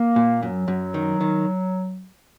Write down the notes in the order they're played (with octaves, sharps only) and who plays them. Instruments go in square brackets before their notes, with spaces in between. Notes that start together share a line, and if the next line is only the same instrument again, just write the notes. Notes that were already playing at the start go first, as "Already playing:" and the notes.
Already playing: [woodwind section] A#3
[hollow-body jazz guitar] A#2
[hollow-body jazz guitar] F#2 [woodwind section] F#3
[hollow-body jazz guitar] F#2
D#3
D#3